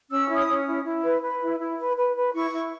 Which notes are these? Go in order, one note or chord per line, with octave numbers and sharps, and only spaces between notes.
C#4 E6
E4
D#6
C#4
E4
E4
B4
B4
E4
E4
B4
B4
B4
E4 C#6
E4